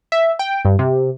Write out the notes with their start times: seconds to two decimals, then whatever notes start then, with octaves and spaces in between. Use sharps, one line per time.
0.12 E5
0.39 G5
0.65 G2
0.79 C3